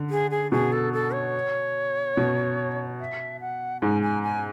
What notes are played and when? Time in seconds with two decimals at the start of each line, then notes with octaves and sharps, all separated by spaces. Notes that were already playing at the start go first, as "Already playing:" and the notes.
Already playing: D3
0.10 G#4
0.31 G#4
0.52 B2 G#4
0.72 A4
0.93 A4
1.13 C#5
2.17 B2
3.00 E5
3.41 F#5
3.82 G#2 G#5
4.02 G#5
4.23 G#5